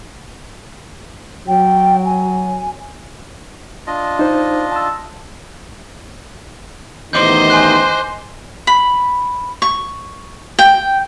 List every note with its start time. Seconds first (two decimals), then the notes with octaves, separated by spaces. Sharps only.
1.48 F#3 G5
2.05 G#5
3.87 D4 F4 D#5
4.19 D#4 C5
4.72 A5 E6
7.13 A1 E2 D#3 C5 D#5 D6 G6
7.50 G#5 C6 F#6
8.67 B5
9.62 C#6
10.59 G5